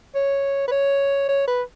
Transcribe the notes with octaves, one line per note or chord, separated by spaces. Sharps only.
C#5
B4
C#5
C#5
B4